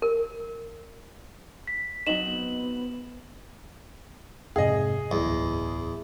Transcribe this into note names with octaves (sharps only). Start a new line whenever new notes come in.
A#4
B6
F#3 C4 D#4 E7 F#7
B3
F2 G#2 C3 G#4 D#5
D1 G1 E2